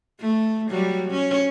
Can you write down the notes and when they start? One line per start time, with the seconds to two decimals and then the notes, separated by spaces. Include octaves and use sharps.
0.20 A3
0.70 F#3 G3
1.10 C#4